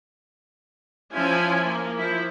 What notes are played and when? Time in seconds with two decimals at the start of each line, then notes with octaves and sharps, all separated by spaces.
1.13 F3 C#4 E4 F4 G#5
1.64 A#3
1.97 F3 E4